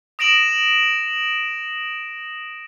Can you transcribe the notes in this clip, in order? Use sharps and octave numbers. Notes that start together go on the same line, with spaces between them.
D#6 A#6 D7 E7 F#7